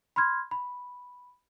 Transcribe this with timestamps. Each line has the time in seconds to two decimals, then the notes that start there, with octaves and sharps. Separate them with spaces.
0.16 B5 C6 F6 G#6
0.51 B5